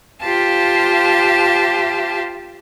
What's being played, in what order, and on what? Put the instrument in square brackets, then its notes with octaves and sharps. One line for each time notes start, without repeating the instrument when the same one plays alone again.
[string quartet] F4 G4 C5 F5 A5